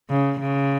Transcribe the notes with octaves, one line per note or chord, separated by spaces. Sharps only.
C#3
C#3